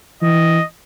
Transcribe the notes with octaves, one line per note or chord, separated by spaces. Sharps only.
E3 D#5